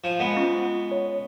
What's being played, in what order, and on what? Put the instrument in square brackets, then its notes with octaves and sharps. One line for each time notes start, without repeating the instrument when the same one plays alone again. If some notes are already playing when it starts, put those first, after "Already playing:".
[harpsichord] F3 G#5
[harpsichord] G#3 B3 [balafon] F#5
[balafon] C#4 F4
[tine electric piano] C#5